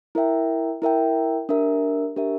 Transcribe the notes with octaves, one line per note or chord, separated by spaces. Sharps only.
E4 A#4 E5 G5
E4 A#4 E5 G5
D4 G4 A#4 E5
D4 G4 A#4 E5